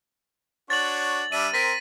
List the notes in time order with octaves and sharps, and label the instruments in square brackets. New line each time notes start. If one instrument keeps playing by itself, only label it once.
[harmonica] D4 F#4 C#5 [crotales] A6 F#7
[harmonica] G3 D4 E5 [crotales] D#7
[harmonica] C4 A#4 [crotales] A#6 B6 D#7